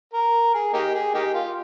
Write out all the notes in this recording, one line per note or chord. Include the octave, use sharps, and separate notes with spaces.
A#4
G#4
A#3 D#4 G4
G#4
A#3 D#4 G4
F4